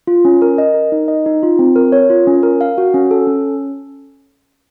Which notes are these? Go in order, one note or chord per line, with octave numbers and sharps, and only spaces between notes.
F4
C#4
A#4
D#5
A#4
D#4
D#5
D#4
F4
C4
A#4
C#5
F4
C#4
A#4
F5
F#4
C#4
A4
C#4